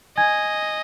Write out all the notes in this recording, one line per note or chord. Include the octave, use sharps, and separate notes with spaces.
D#5 G#5 G#6